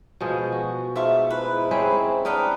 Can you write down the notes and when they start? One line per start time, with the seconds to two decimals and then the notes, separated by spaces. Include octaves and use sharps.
0.20 B2 F3 G#3
0.52 F#4
0.96 G#2 F4 E5 A5 C#6
1.30 G#2 E4 B4
1.71 G#3 C4 C#4 B5
2.25 D4 A#4 B4 D#5 F#5 G5